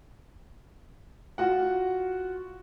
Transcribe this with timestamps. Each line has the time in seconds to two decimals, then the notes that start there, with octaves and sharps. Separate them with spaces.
1.38 F4 F#4 F#5